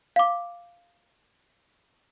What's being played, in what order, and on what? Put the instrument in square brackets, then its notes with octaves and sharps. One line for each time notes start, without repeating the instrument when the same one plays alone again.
[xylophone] F5 D6